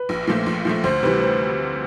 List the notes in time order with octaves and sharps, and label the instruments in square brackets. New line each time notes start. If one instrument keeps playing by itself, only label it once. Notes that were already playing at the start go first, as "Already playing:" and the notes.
Already playing: [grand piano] B4
[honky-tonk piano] A#1
A#2 F3 A3
A#1
A#2 F3 A3
[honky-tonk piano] D2 [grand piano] C5
[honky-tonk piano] C3 E3 G3 [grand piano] B4
[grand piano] C5